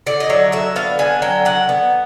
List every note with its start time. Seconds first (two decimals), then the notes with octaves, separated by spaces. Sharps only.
0.06 D3 D5
0.20 D#5
0.30 F#3 E5
0.52 D3 E5
0.76 B3 F5
0.99 D3 G#5
1.22 F#3 G5
1.45 D3 F#5
1.69 B3